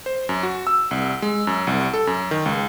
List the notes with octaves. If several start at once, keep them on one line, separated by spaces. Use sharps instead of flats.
C5
F#2
F#4
E6
C2
G#3
F#2
C2
A4
F#2
D#3
C#2